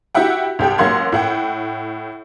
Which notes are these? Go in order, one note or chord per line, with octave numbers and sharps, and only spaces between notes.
E4 F#4 G4 E5 F#5 G5
C2 G4 A4 G5
A1 F#3 A#3 F#5 C6 G#6
A2 F#5 G5